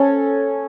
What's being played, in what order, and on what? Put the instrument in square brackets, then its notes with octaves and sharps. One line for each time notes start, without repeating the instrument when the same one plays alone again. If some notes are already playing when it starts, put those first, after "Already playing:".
Already playing: [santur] C#4 A4